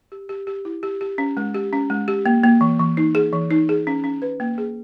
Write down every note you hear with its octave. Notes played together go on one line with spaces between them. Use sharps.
G4
G4
G4
E4
G4
G4
C#4
G#3
G4
C#4
G#3
G4
A#3
A#3
E3
E3
D#4
G#4
E3
D#4
G#4
C#4
C#4
B4
A#3
G#4